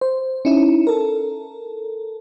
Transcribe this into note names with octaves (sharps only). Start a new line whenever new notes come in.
C5
C#4 D#4 E4
A4 A#4